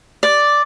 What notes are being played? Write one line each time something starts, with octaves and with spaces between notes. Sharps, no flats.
D5